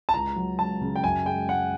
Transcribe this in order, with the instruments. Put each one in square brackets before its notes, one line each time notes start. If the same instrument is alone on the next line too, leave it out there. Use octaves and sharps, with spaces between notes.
[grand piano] A5
C#2 A#5
F#3
C#2 A5
C#3
G5
F#2 G#5
G#3 G5
G#3 F#5